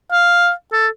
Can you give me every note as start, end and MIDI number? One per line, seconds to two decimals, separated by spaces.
0.12 0.50 77
0.72 0.87 69